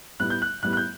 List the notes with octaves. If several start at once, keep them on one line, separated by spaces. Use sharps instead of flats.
A2 G3 B3 F#6
G6
F#6
A2 G3 B3 F#6
F#6
G6